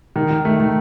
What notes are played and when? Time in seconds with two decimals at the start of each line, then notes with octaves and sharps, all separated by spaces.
0.16 D#3
0.31 D#3
0.45 A3
0.60 D#3